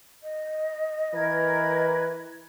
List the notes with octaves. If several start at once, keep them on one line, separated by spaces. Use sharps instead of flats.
D#5
E3 A#4 B4 G#6